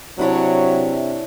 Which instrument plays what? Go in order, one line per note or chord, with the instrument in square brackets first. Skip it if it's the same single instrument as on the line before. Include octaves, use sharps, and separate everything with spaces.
[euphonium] C3 [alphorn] F#3 [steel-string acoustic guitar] D4 E4 C#5